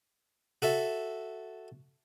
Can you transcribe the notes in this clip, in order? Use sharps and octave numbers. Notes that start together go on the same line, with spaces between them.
F#4 A4 E5